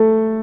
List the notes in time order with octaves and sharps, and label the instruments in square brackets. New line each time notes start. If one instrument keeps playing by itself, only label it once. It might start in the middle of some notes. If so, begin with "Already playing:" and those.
Already playing: [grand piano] A3 A4